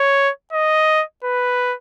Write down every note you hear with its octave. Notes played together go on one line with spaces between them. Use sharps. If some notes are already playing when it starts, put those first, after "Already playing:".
Already playing: C#5
D#5
B4